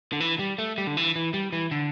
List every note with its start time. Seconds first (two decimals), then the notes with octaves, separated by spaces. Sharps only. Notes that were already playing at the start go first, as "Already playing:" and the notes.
0.13 D3
0.20 E3
0.39 G3
0.58 A3
0.78 G3
0.87 D3
0.97 E3
1.16 E3
1.34 G3
1.52 E3
1.71 D3